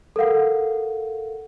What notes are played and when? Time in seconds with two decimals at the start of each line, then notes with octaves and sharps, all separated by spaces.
0.16 A4 A#4 F5 F#5